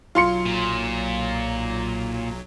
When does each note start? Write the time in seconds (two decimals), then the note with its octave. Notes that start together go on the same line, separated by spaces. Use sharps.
0.15 B1 F#3 F4 C6 C#7
0.46 A#2